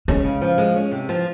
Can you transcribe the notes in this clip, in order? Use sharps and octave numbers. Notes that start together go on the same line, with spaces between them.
G#3 C#4
C#3
F3
G#3
C#4
C3
F3